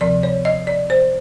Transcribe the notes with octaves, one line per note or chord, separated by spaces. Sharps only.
D2 C3 F3 D5
C#5
D#5
D5
C5